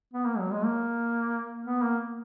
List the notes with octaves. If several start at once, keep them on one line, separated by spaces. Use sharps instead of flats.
B3
A#3
F#3
G#3
A#3
B3
A#3